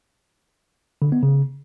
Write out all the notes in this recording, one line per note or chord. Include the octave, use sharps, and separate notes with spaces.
D3
B3
C#3